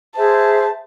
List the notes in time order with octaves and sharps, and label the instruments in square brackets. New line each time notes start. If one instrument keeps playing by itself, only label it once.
[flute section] G#4 C5 E5 [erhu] A5